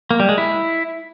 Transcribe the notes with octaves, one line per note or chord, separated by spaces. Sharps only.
A#3
G3
G#3
E4